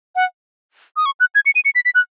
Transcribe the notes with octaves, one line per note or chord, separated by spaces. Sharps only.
F#5
D#6
C#6
F#6
G#6
C#7
D#7
C#7
B6
B6
F#6